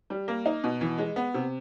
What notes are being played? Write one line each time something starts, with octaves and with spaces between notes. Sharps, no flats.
G3
A#3
D#4
B2
E3
G#3
B3
C3